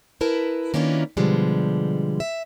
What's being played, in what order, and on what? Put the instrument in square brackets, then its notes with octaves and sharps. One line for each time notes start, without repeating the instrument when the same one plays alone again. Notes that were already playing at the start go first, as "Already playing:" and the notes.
[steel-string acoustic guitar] E4 A#4 B4 A5
D#3 A#3 C#4 D4 E4 F4
B2 D3 F3 G3 G#3
E5